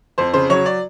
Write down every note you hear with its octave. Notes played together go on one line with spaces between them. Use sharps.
F2 C5
C#3 C5
F#3 C#5
D5